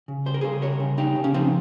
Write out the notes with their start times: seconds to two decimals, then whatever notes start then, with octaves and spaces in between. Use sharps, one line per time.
0.08 C#3
0.26 G3 C5
0.34 A#4
0.41 C#3 G#4 C5
0.62 G3 A#4 C#5
0.80 C#3
0.98 C#3 D#4 G4
1.16 C#3
1.24 C#4
1.34 F3 C4 D#4